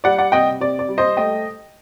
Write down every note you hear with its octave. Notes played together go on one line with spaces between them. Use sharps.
G3 D5 F#5
D5 F#5
C3 D#5 G5
C3 D5
D5
G3
C5 D#5
A3 D#5 G5